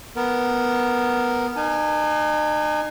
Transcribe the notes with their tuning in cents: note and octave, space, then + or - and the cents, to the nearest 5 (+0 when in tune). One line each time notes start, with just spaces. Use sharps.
B3 +0 A#4 +0
D#4 -40 G#5 +0